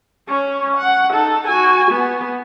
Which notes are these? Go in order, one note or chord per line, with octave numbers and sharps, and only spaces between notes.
C#4 C#5
F#5
D#4 A4
F#4 G#5
B3